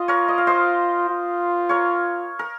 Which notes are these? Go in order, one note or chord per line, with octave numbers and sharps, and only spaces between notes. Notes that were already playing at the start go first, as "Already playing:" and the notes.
Already playing: F4 D#5
A#4 C#5
D#5
F5
C5 D#5
F4
A#4 C#5
A#4